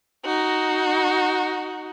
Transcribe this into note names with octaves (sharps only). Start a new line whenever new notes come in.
D#4 F#4